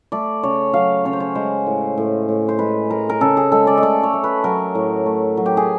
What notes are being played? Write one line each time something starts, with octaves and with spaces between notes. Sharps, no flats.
A3 D5
C#3 C#5
F#3 F5
C#3 C#5
C5
C#5
G#3 C5
A2
A2
A2
C5
G#3 B4
G#3 A#4
A#4
C#3 A4
G#4
G#3 A4
D5
D#5
A3 D5
C#5
A3
B4
F#3 A#4
A2
A3
F#3
G4
G#4